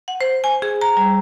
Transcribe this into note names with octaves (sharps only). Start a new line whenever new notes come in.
F#5
C5
G#5
G#4
A#5
G3